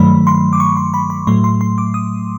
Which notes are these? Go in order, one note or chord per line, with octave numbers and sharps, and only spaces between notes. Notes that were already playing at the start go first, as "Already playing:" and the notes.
Already playing: G2 D#3 F#3 A3 B5
C6
D6
C#6
C6
B5
B5
A2 F#3 A3 C6
C6
C6
D6
D#6